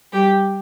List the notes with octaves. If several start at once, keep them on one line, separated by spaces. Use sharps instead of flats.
G3 G4